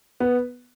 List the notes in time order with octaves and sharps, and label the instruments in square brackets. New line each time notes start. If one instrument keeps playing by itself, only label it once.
[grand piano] B3